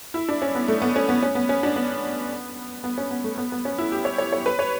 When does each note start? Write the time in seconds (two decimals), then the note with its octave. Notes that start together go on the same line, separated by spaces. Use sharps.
0.14 E4
0.29 D4
0.42 C#4
0.55 B3
0.68 A3
0.82 B3
0.96 C#4
1.09 B3
1.23 C#4
1.35 B3
1.49 C#4
1.63 D4
1.76 B3
2.84 B3
2.98 C#4
3.11 B3
3.24 A3
3.37 B3
3.52 B3
3.65 C#4
3.78 E4
3.92 G4
4.05 C#5
4.18 C#5
4.33 C#5
4.46 B4
4.59 C#5